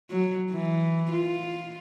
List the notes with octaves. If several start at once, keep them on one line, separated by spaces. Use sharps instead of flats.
F#3
E3
F4